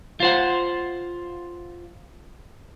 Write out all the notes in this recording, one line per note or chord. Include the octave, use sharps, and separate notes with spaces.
F4 C5 F#5